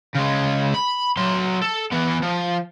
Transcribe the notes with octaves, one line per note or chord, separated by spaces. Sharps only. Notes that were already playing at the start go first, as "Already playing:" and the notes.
C#3 G#3
B5
F#3 C6
A4
E3 B3
F3